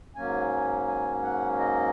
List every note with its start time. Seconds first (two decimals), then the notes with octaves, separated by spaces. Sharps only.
0.16 G#2 F#3 A#3 C#4 G#5
0.88 G#5
1.23 F#5
1.59 D#5